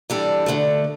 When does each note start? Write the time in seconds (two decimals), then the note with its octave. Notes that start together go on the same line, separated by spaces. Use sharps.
0.10 E3 G3 D4 A4
0.46 D2 D3 A3